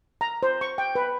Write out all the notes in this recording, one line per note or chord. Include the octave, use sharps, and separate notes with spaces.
A#5
C5
C#6
G5
B4